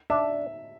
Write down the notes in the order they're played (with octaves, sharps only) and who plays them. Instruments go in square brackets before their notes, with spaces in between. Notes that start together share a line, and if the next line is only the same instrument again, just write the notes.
[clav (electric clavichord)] D4 [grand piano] E5